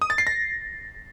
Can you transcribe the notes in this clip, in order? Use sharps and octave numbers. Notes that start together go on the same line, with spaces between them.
D#6
A6
C7
A#6